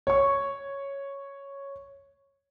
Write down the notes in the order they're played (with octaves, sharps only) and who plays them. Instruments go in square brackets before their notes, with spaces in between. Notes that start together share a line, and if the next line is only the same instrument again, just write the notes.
[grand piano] C#5 C#6